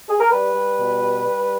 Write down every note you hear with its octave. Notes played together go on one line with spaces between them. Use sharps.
G#4
A#4
G3 B4
G3
B2
G3
G3